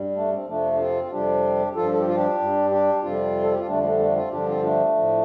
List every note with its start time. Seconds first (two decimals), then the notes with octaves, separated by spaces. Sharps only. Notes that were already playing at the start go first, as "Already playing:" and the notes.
Already playing: G2 G3
0.16 A3 D4
0.32 C4
0.47 F2 C3 F3 A3 D4
0.72 D4
0.80 C4 F4
1.04 F4
1.11 F2 C3 G3 D4 G4
1.75 G2 F3 F4 A4
1.91 A4
1.99 G4
2.08 F4
2.15 D4 G4
2.39 G2 G3
2.71 D4 G4
3.03 F2 C3 G3 C4 F4
3.43 A4
3.51 G4
3.59 F4
3.67 F2 D3 G3 A3 D4
3.83 A3 D4
3.99 A3 D4
4.15 C4 F4
4.31 G2 D3 F3 D4 G4
4.47 C4 F4
4.62 A3 D4
4.95 A2 F3